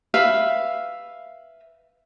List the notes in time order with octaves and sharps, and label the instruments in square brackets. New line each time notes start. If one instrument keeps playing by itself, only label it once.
[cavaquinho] B4 E5 F5